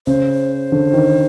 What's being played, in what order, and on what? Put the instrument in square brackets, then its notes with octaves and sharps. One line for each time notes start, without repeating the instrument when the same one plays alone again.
[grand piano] C#3 [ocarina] C5
[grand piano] D3
D#3